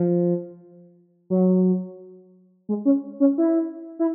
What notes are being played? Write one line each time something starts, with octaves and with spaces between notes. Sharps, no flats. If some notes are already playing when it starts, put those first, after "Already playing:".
Already playing: F3
F#3
G#3
C#4
C#4
E4
E4